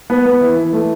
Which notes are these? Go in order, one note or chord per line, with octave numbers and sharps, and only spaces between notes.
B3
B3
E3
E3
A3